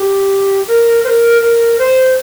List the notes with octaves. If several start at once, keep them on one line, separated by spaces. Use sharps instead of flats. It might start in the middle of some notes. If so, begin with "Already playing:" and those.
Already playing: G4
A#4
C5
A#4
A#4
C5